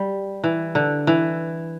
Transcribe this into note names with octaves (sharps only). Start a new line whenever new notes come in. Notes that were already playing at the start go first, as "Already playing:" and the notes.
Already playing: G3
E3
D3
E3